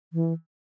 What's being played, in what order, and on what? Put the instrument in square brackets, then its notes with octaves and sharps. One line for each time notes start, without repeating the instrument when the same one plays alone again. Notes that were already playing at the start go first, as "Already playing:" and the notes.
[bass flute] E3